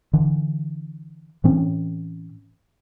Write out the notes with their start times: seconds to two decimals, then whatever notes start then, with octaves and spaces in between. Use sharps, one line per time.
0.13 D3 E3
1.44 A2 E3 C4 C#4